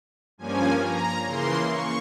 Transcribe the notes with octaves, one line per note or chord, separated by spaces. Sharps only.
G2 F3 A#3 C#4 G#5
A#5
C#3 E3 A#3 C6
C#6